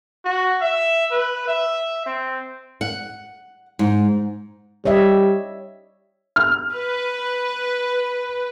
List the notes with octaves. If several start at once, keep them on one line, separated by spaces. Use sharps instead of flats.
F#4
E5
B4
E5
C4
F#5
G#2
G3 C#5 D#5 E5
F6
B4